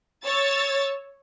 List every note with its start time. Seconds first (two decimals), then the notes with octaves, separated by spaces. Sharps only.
0.25 C#5 E6 A6